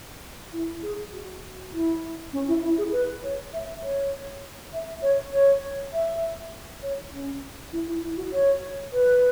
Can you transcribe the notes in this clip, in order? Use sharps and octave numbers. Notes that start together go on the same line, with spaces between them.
E4
G#4
F#4
E4
C#4
E4
E4
G#4
B4
C#5
E5
C#5
E5
C#5
C#5
E5
C#5
C#4
E4
E4
E4
F#4
C#5
B4